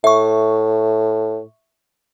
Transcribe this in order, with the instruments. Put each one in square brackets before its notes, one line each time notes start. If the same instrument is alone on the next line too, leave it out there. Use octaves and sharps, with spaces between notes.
[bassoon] A2 [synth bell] E5 C#6